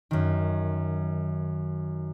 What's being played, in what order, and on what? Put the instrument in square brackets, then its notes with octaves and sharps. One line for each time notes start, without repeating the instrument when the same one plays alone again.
[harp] F#2 D#3